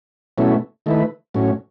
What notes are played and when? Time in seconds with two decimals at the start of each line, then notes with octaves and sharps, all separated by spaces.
0.38 B2 F#3 A3 C#4 E4
0.86 D#3 A3 E4 B4
1.34 A2 F#3 C#4